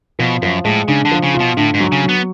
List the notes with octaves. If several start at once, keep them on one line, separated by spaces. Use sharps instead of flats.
B2 F3
F#2 F3
A2 G#3
C#3 D4
D3
F3
C#3
F4
B2
A2 D3
G#2
F#3
C#3
F#3
B3